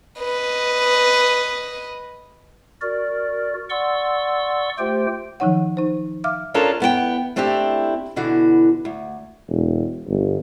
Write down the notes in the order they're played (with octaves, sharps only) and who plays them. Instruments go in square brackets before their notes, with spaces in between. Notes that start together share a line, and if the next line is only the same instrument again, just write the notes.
[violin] B4 D#5
[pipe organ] F#4 A#4 D5
D5 F#5 C6 C#6 E6
A3 F4 G4 C5 G5
[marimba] D#3 F3 F#3 D#4 C#5 F#5
D#4 C5
E5 F5 D6 F6
[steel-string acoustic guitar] C#4 D4 F4 A4 A#4 C#5
E2 B3 F#4 G5
A3 C4 D4 E4 G4
B2 D3 E3 F#4
D2
[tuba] E1
G1